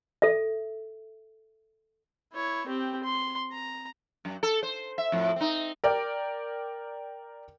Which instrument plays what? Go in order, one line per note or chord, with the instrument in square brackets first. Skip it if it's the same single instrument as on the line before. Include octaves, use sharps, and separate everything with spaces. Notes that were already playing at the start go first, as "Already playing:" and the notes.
[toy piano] A4 E5
[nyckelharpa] E4 C#5
C4 G4
C6
A#5
[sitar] F#2
A4
C5
E5
F2 A2
C4 D#4
[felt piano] A#4 D5 G5